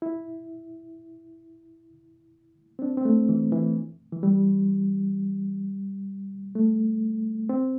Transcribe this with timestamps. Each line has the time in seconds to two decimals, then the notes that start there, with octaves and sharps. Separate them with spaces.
0.02 E4
2.79 C4
2.82 D4
2.97 C4
3.05 A3
3.29 E3
3.52 E3
4.12 E3
4.23 G3
6.55 A3
7.49 C4